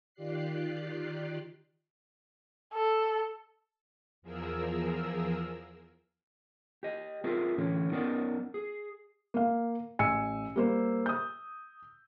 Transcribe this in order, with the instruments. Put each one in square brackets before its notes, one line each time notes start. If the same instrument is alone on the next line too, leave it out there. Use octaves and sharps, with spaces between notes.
[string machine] D#3 F4 G4 D5 F#6 C7
[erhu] A4
[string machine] E2 F3 G#4 A#4 E6
[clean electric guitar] G4 D#5
C4 E4 F4 G#4 A#4
A2 D3 E3 C#4 E4
F#3 B3 C#4 D#4 A#4 D5
G#4
[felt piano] A#3 F5
A1 G#5 E6 C#7
G3 A#3 C5
D#6 G6